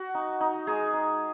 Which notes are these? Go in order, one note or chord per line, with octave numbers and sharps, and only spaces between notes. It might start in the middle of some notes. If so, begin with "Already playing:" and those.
Already playing: F#4
D#4
D#4
G#3 D#4 G#4
D#4